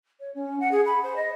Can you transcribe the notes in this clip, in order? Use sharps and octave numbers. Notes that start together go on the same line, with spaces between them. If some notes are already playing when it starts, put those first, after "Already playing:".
C#5
C#4
F#5
G#4
B5
C5
D#5